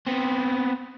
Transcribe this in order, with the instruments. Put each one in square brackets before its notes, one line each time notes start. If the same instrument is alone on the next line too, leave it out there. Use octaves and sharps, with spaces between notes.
[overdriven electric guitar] B3 C4